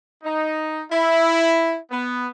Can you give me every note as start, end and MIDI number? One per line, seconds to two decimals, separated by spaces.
0.24 0.82 63
0.91 1.75 64
1.91 2.27 59